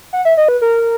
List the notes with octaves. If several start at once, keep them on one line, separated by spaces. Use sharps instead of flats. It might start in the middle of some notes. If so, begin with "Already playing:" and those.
F#5
E5
D#5
B4
A#4